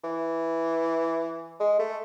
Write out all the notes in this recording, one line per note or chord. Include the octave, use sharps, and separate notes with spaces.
E3
G#3
A3